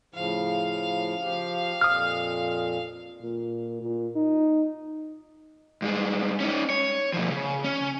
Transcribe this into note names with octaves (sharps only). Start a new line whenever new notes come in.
A2 C#3 F3 F5
F3 G4
F2 A#2 D#6 F6
A#2
A#2
D#4
G2 G#3
C#4 D#4
C#5
B2 F3
C#3
C#4